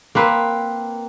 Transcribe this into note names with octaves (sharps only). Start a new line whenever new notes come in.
A#3 C4 B4